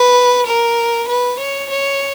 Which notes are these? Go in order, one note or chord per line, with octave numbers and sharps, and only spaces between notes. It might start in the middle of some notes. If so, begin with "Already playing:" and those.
Already playing: B4
A#4
B4
C#5
C#5